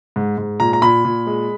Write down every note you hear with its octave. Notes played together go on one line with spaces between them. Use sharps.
G#2
G#2
A#2 A#5
A#5
A#2 B5
A#2
G#3